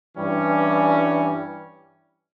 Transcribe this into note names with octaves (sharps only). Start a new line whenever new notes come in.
G2 E3 G3 C#4